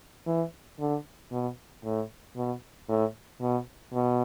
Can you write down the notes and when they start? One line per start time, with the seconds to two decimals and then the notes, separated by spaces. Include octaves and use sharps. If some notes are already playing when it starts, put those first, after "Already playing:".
0.27 E3
0.79 D3
1.32 B2
1.84 A2
2.36 B2
2.89 A2
3.41 B2
3.94 B2